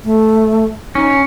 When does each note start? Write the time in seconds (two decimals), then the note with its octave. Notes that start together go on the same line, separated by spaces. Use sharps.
0.05 A3
0.95 C#4 D#4